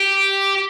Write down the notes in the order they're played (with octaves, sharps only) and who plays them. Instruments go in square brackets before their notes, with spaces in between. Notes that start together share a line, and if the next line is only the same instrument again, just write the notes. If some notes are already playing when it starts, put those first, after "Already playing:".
Already playing: [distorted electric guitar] G4